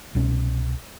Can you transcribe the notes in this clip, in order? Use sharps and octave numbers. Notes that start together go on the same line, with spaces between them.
C2 B2 C#4